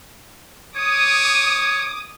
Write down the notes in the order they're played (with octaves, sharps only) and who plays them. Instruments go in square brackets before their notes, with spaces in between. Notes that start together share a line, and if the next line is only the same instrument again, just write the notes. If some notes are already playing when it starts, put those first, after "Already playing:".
[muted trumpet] C#5 [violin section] D6 D#6